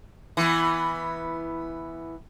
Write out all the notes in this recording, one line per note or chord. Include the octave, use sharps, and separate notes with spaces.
E3 B3